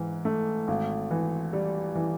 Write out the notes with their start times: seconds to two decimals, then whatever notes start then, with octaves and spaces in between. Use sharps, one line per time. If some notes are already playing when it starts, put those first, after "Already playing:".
Already playing: G#2 E3
0.25 A3
0.68 G#1
1.11 E3
1.53 G3
1.95 E3